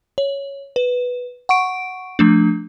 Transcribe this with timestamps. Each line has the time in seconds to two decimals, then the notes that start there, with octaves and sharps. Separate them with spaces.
0.18 C#5
0.76 B4
1.49 F#5 C#6 D7
2.19 F3 A3 D4